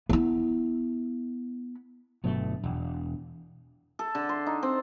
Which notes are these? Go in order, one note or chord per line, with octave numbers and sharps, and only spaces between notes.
B3 E4
G1 B2 F#3 A3
E1
A4
D3
C6
D#4
C4